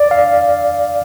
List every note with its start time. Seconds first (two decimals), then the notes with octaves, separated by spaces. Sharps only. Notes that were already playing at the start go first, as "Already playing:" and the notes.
Already playing: D5
0.11 F5